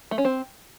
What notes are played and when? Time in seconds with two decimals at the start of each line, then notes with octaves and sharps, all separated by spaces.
0.11 A3
0.18 C#4
0.25 C4